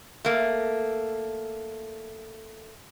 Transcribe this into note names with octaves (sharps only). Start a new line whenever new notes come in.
A3 A#3